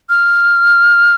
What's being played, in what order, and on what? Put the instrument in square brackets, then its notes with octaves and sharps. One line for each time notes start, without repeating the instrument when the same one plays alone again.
[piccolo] F6